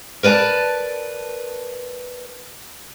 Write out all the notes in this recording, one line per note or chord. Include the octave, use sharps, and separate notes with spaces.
A#4 B4 D5 G5 A5